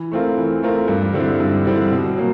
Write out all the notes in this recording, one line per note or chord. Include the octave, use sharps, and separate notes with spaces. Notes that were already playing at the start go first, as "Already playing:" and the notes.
Already playing: E3
A3 C4 F4 A#4
E3
A3 C4 F4 A#4
G2
D3 G3 C4 E4
G2
D3 G3 C4 E4
B2
F#3 A#3